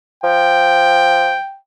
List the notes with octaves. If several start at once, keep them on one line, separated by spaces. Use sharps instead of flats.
F3 G5